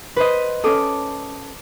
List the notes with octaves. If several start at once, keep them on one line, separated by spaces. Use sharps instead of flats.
B4 C5 D#5
C#4 A4 D6 D#6